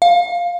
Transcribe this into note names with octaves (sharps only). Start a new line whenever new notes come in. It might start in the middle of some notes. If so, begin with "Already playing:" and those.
F5